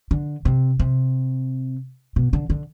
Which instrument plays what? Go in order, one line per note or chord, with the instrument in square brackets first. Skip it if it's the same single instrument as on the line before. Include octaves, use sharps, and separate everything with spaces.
[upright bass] D3
C3
C3
B2
D3
D3